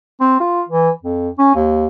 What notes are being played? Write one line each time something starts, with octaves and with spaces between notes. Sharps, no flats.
C4
F4
E3
F2
C#4
D#2